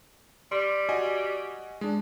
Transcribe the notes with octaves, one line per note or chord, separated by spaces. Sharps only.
G3 C6
F#4 D#5 G#5
G#3 D4